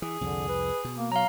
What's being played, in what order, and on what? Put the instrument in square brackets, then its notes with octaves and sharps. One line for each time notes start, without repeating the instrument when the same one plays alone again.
[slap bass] E3 [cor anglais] G#4
[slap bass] C2 F2 [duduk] D3
[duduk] B4
[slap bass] B2
[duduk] A#3
[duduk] F#3 [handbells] F5 A#5